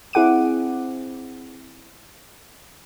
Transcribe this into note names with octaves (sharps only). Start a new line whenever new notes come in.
C4 E4 G#4 F#5 D6 D#7